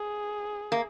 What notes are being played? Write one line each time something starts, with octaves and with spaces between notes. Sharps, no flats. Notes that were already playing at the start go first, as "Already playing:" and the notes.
Already playing: G#4
A#3